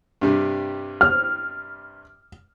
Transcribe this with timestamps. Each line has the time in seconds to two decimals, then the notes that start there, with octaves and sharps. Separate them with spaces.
0.21 G2 C3 G3
1.01 F6